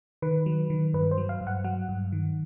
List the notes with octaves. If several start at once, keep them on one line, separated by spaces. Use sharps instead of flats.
D#3 B4
F#3
D#3
G2 B4
C5
F#3
F5
G2
F#5
F#3 F#5
G2
D#3